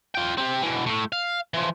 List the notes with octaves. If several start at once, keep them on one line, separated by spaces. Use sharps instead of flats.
F4 G5
C4 G4
B2 E3
A2 A3
F5
E3 F3